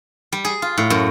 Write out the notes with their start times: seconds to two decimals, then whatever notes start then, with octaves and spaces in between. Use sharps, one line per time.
0.32 G3
0.45 G#4
0.62 F4
0.78 A2
0.90 F#2